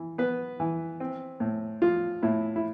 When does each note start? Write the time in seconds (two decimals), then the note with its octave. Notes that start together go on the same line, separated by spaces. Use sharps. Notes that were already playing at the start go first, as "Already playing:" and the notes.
Already playing: E3
0.18 B3 B4
0.60 E3
1.00 C4
1.40 A2
1.82 F3 F4
2.23 A2 E4
2.56 E4